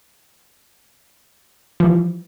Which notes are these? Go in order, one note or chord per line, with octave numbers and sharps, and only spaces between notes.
E3 F3 G3